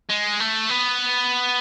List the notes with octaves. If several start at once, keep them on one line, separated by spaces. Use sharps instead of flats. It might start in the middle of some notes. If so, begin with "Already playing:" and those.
G#3
A3
B3